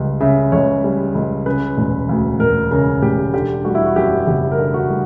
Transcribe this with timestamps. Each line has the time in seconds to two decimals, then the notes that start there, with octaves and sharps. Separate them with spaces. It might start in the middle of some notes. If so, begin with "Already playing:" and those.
Already playing: C#2 G3
0.20 C#3 E5
0.52 C#2 C#5
0.84 G3
1.15 C#2
1.46 C#3 B4
1.77 E1
2.09 D2
2.40 E1 A#4
2.71 C#3 A#4
3.02 E1 G4
3.33 D3 G4
3.65 G3 F#4
3.75 E4
3.86 F#4
3.96 F#2 G4
4.27 F#1 G4
4.51 A#4
4.59 D3
4.74 F#4
4.90 G3